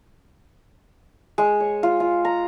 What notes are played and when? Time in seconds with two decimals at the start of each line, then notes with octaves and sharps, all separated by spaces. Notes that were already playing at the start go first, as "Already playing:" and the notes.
1.38 G#3
1.60 C#5
1.83 F4
2.00 F4
2.25 A#5